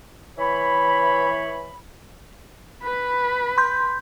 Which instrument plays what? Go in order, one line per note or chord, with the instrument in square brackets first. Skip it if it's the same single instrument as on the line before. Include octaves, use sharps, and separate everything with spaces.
[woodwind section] E3 C#5 B5
[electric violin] B4 B5
[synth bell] C6 G6